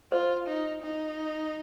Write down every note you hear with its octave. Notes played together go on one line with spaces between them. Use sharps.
F4 C5
D#4
D#4